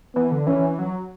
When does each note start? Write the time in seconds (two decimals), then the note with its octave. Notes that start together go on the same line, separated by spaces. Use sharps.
0.15 E3 B3
0.31 D3
0.47 E3 C#4
0.79 F#3